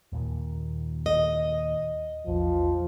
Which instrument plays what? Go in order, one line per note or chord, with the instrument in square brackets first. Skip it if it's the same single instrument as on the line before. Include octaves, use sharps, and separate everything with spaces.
[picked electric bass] D#2 A#2 D#3
[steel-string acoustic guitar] D#5
[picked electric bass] A#1 E2 [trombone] F3